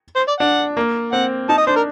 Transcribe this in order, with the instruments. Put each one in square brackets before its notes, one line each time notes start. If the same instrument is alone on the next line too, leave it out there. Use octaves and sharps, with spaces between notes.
[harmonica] C5
D5
[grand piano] D4 [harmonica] F#5
[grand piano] A#3
[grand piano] C4 [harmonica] F#5
[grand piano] D#4 [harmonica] A5
[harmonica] D#5
[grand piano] D4 [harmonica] C5
[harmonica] A#4